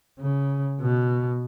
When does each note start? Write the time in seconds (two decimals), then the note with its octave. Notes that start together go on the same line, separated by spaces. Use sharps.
0.19 C#3
0.80 B2